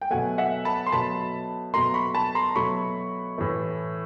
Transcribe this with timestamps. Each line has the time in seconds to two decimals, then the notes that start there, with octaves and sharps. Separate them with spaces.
0.01 G5
0.11 B2 F#3 A3 F#5 G#5
0.38 E5 F#5
0.65 A5 B5
0.87 C6
0.92 B2 F#3 A3 A5 B5
1.74 B2 F#3 A3 A#5 C6
1.94 B5 C#6
2.15 A5 B5
2.35 A#5 C6
2.55 B2 F#3 A3 B5 C#6
3.38 A2 E3 A3